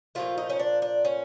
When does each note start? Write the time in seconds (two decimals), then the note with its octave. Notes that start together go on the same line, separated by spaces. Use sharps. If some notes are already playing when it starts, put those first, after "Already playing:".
0.15 A#2 F3 A3 F4
0.38 D#4
0.49 C#4
0.59 D4
0.82 D4
1.05 C#4